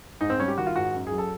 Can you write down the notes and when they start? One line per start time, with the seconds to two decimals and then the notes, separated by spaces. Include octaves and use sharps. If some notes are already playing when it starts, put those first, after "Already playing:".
0.21 G#2 D#4
0.30 C4
0.39 G3 C#4
0.48 G4
0.58 D#3 F#4
0.66 F4
0.76 G#2 F#4
0.94 F#2
1.07 G#4
1.12 F#3
1.18 A4